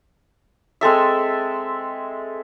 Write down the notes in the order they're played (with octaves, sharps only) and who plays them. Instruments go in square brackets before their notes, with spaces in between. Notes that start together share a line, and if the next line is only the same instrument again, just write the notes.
[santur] G#3 C4 A4 E5